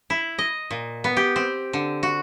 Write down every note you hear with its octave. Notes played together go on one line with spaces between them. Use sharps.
E4
D#5
A#2
B3
G4
C4
D3
F#4